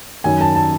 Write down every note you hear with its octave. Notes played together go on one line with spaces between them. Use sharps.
F#2 D#3 G#5
A5
A5